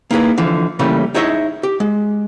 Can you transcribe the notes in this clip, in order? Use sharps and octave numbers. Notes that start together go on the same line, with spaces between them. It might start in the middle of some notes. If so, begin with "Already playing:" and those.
A#3 D#4 E4 G#4 B4
D3 E3 F3
C#3 E3 G3 A3 A#3
D#4 E4 G#4 C#5 D#5 E5
G4
G#3